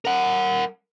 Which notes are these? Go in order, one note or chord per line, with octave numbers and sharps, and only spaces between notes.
A#4 F#5